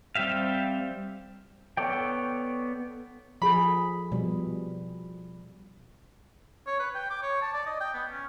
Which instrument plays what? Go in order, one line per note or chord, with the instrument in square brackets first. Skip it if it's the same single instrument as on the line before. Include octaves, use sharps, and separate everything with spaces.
[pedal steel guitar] G3 C4 G4 E5 F5
B3 A4 C#5 D5 G5
[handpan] F3 G#4 A4 [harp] B5
[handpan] B2 F3 G3
[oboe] C#5
B4
G5
D6
C#5
A5
D5
D#5
G5
B3
C#4